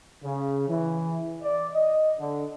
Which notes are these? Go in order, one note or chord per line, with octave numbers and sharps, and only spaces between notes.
C#3
E3
D5
D#5
D3